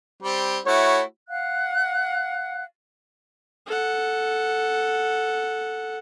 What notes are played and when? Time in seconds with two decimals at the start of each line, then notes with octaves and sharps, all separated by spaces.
0.23 G3 C4
0.66 A3 E4 F#4 C#5
1.28 F5 F#5 F#6
3.67 A4 F#5